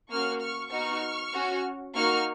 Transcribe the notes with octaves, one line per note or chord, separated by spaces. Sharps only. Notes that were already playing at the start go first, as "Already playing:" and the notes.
A#3 C#4 F#4 C#6 F6
C#6 F6
B3 D#4 F#4 C#6 F6
C#4 F#4
A#3 D#4 F#4 C#6 F6